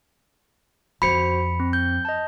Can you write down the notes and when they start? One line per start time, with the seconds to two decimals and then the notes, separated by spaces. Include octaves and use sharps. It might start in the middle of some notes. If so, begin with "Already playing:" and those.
1.02 F2 F#4 C5 B5 C#7
1.60 C4
1.73 G6
2.05 D#5 A5